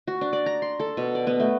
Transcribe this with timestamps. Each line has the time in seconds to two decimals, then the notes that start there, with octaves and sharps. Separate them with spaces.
0.08 F#4
0.21 D4
0.33 D5
0.46 A#5
0.62 C6
0.80 A4
0.97 B2
1.15 D5
1.27 B3
1.40 A3